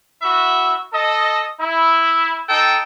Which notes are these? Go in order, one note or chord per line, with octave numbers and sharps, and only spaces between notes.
E4 F#4 E5
A4 D#5
E4
D#4 A4 G5